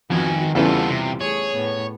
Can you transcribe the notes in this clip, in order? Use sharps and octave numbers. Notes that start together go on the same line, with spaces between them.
F2 D#3 B3 F#4 G#5
E2 C#3 E3 G3 B3 C4 F4 A4
C3
A3 G#4 C#5
A2 B3